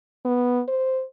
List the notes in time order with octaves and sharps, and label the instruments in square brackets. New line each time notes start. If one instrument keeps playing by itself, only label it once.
[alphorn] B3
C5